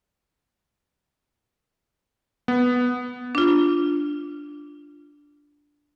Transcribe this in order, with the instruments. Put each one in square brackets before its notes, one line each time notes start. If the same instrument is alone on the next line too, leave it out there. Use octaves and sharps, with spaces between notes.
[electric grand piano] B3
[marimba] D4 F4